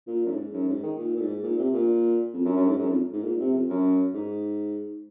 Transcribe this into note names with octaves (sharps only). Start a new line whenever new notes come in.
A#2
F#2
G#2
F#2
G#2
D#3
A#2
A#2
G#2
A#2
C3
A#2
F2
F#2
F#2
G#2
F#2
F2
G#2
A#2
C3
F2
F#2
G#2